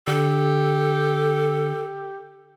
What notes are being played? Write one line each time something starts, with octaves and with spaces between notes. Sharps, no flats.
D3 G4 A4